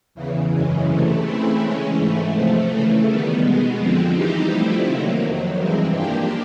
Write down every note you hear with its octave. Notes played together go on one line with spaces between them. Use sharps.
E2 C#3 E3
F#2 C#3 E3 G#3
C3 E3 A3
C#3 E3 A3 C4 E4
E3 G#3 C#4
G#2 E3 A3
C3 F3 A3
C#3 E3 A3
D#3 G3 B3
B2 G#3 B3
F2 D3 F3 G#3 C4
E3 G3 C4 D#4 G4
D3 F3 A3 C4 E4
C3 D#3 F#3 A#3
F2 C3 D#3 F#3
G2 E3 G#3 C4
F3 A#3 D4 G4